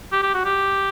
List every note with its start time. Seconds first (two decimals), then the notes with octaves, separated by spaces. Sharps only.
0.12 G4
0.23 G4
0.34 F#4
0.45 G4